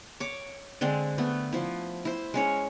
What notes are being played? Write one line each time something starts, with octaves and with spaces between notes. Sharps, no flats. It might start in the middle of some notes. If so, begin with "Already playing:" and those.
C#5 D6
D3 G#3 C4 D4
A3 B3
F3 E4
E4 C5
G#3 C#4 C#5